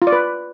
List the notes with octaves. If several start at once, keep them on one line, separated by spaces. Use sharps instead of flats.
F4
D5
B4